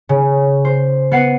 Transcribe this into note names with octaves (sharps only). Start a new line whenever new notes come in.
C#3
C5
B3 F#5 C7 D#7